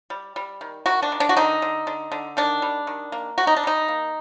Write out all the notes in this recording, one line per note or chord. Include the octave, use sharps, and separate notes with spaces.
G3
G3
D#3
D#3 F#4
D4
D#3
D4
F#4
D3 D#4
D3
D3
D3
D#3 D4
G3
D#3
A#3
D3 F#4
D#4
D4
G3 D#4
A#3